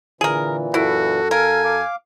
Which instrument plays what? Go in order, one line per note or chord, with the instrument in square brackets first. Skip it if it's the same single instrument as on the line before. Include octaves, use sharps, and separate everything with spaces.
[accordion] A#2 E3 [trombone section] D3 [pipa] G#4 A#4
[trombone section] F#2 A4 [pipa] E4 [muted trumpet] F#4
[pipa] A#4 [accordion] F5 [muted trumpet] G#5
[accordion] F5 D6